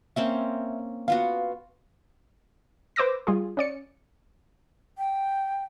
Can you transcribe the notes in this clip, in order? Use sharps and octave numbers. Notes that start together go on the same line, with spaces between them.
A#3 C4 C#4 E5
B3 F4 F#4 F5
B4 C5 D6 E6 A#6
G3 F4 G#4
C#4 D5 C#7
G5